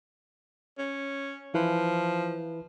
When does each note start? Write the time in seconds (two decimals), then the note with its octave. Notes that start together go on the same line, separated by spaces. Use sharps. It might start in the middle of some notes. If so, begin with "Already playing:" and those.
0.78 C#4
1.54 E3 F3 E4 B4